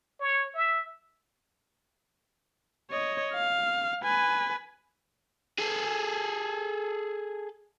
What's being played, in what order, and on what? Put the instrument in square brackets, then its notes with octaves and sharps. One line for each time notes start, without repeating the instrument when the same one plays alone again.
[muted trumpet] C#5
E5
[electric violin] C#5 D#5
F5
B4 G#5
[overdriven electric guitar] G#4 A4